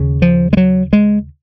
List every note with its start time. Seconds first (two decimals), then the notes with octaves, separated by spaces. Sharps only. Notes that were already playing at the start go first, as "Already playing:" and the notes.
Already playing: D#2 C#3
0.22 F3
0.53 G#3
0.57 F#3
0.93 G#3